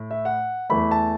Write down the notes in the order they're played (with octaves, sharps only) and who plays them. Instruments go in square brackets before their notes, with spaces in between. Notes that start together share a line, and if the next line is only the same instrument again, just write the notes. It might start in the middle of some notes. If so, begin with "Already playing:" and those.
Already playing: [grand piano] A2 A3
E5
F#5
E2 E3 A3 B5
A5